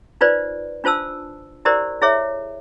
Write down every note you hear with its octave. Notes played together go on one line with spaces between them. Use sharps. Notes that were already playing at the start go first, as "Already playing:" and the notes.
D#4 F4 B4 C5 D5
D4 F4 C5 A5 E6
E4 G4 A#4 C5 D5
E4 G#4 C#5 E5